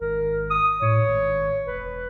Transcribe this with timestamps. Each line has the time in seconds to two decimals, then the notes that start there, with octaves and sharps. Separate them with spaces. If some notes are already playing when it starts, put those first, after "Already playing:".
0.01 G#1 A#4
0.50 D#6
0.82 A2 C#5
1.08 G#1
1.67 E1 B4